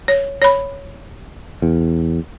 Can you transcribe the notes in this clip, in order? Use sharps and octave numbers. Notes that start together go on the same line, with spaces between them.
C#5
C#5 B5
E2